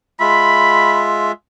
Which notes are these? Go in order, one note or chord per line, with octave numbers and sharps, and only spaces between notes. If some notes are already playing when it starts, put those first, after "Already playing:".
G#3 F4 E5 B5